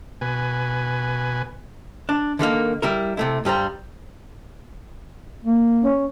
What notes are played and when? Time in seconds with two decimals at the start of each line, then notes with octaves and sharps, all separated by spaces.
0.21 B2 B4 G#5
2.09 D4
2.39 D3 D#3 G#3 A#3
2.82 G3 E4 A#4
3.17 C3 A3 E4
3.45 G2 G3 C5 A#5
5.44 A#3
5.82 C#4